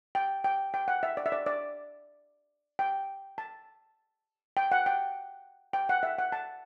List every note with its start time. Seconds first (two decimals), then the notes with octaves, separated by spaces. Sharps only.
0.15 G5
0.44 G5
0.74 G5
0.88 F#5
1.03 E5
1.17 D5
1.26 E5
1.32 D5
1.46 D5
2.79 G5
3.38 A5
4.57 G5
4.72 F#5
4.86 G5
5.73 G5
5.89 F#5
6.03 E5
6.18 F#5
6.32 A5